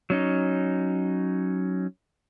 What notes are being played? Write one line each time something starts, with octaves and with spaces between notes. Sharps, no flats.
F#3 C#4 D#4